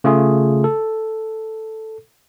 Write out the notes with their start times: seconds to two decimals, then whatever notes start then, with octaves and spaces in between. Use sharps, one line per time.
0.04 C#3 A3 F4 G#4
0.64 A4